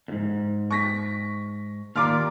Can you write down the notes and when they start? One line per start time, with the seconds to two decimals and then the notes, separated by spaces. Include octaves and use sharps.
0.08 F2 G#2
0.71 C#6 A#6 B6
1.96 D#2 F4 D5 A#5 D6 F6